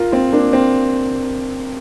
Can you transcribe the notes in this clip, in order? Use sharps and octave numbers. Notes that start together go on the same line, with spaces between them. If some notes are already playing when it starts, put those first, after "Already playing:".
Already playing: F4 A#4
C4 F4
A#3 D4
C4